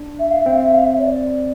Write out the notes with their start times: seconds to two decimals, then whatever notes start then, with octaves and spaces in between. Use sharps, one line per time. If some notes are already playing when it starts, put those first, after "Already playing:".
Already playing: D4
0.19 E5
0.30 F5
0.40 E5
0.46 C4
0.52 F5
0.63 E5
0.74 F5
0.84 E5
0.99 C#5
1.03 D5